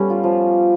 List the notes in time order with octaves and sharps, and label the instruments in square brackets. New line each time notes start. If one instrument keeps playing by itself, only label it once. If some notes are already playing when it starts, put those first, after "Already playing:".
Already playing: [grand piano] G3 [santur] A3 B3 C#4 B4
[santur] F4
F3